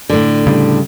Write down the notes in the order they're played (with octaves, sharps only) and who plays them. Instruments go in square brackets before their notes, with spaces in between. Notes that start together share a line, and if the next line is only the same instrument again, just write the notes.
[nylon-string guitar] A2 D3
[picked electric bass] C#3 G3